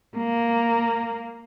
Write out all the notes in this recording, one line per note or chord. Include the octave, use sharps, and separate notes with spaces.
A#3